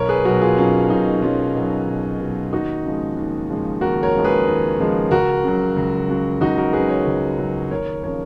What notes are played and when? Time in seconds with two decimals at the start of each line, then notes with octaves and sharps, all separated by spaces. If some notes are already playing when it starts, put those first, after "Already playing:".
Already playing: B1 A#4 C#5
0.09 G#4 B4
0.25 B2 F#3 F#4 A#4
0.41 F4 G#4
0.58 B1 C#4 F4
0.89 B2 F#3 D#4
1.22 B1 C#4 F4
1.55 B2 F#3
1.87 B1
2.20 B2 F#3
2.52 D#2 D#4 F#4
2.85 C#3 F3 G#3
3.17 D#2
3.49 C#3 F3 G#3
3.81 D#2 F#4 A#4
4.03 A#4 C#5
4.14 C#3 F3 G#3
4.24 G#4 B4
4.46 D#2
4.79 C#3 F3 G#3
5.11 C#2 F#4 A#4
5.44 C#3 F#3
5.77 C#2
6.08 C#3 F#3
6.41 C#2 D#4 F#4
6.58 F#4 A#4
6.73 C#3 F#3 G#4 B4
6.89 A#4 C#5
7.06 C#2
7.38 C#3 F#3
7.71 D#2 A#4 C#5
8.03 C#3 F3 A#4 C#5